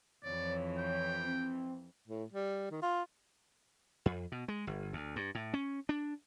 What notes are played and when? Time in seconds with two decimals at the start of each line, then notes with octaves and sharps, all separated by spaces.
0.24 F2 E3 C#5 D5
0.78 G5
1.24 C4
2.08 A2
2.32 G3
2.71 D#3
2.82 F4
4.06 F2
4.32 B2
4.48 G#3
4.67 G1
4.93 D2
5.16 G2
5.35 A2
5.54 C#4
5.89 D4